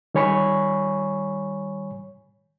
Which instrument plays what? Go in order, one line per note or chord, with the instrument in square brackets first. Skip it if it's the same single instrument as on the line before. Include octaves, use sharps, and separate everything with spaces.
[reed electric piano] D#3 G3 C#5 G#5 B5 C#6